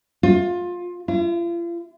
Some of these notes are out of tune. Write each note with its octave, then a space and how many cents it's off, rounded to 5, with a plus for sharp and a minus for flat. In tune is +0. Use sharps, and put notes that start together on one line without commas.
F4 +20
F4 -40